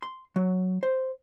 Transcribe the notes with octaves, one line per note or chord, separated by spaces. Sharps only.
C6
F#3
C5